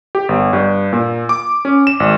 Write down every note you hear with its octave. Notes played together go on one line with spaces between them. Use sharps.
G4
G1
G2
A#2
D6
C#4
E7
G#1